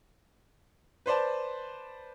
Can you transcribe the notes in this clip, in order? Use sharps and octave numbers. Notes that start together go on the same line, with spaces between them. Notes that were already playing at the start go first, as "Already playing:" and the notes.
B4 C5 D5 A5